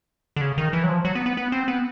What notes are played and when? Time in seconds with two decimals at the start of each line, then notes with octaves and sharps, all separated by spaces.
0.36 D3
0.41 C#3
0.58 D#3
0.73 E3
0.84 F#3
0.89 F3
1.05 F#3
1.15 B3
1.26 B3
1.37 B3
1.52 C4
1.68 B3